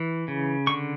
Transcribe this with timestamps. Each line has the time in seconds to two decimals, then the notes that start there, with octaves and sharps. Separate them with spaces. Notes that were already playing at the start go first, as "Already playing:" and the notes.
Already playing: E3
0.28 C#3
0.67 D3 C#6